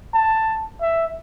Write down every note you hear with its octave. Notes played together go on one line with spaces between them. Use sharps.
A5
E5